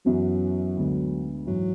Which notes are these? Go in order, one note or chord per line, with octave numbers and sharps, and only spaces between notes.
F#2 E3 F#3 B3 F#4
D2 D3 G#3 B3
G#2 E3 F#3